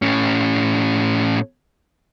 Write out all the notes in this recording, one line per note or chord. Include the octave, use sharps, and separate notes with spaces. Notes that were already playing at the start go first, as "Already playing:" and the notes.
A2 C#4